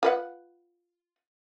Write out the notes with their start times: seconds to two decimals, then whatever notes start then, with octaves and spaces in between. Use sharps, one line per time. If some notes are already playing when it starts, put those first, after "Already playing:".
0.03 F4 B4 F#5